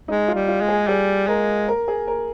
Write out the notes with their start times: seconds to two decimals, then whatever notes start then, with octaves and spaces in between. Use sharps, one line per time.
0.08 G#3 D#4
0.28 F4
0.34 G3
0.48 F4
0.61 G#3
0.68 G#4
0.88 G3 G#4
1.27 G#3 A#4
1.68 A#4
1.88 G#4
2.08 A#4